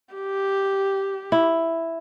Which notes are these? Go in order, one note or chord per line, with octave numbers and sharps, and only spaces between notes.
G4
E4